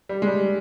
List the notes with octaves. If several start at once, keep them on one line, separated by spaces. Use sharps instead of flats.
G3
G#3
G3